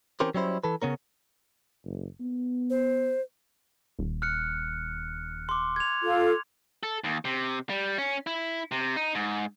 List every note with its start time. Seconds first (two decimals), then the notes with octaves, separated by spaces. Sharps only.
0.20 E3 C4 C#4 G4 A#4 C5
0.34 F#3 G3 C#4 E4 C5
0.64 E3 A4 B4
0.82 C#3 B3 C#4 A#4
1.85 F#1
2.20 B3
2.70 C5
3.99 D#1
4.22 F6 F#6 C#7
5.49 C6 D6
5.76 G#6 F7
6.03 F4 A4
6.83 A4
7.04 D#2
7.25 C3
7.70 G3
7.98 C#4
8.27 E4
8.71 C3
8.96 D#4
9.15 G#2